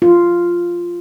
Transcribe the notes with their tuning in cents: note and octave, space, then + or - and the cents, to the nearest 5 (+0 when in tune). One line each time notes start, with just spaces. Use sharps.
F4 -5